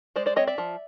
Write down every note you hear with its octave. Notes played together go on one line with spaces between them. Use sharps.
G#3 C5 D5
C5 D5
C4 C#5 D#5
D5 E5
F3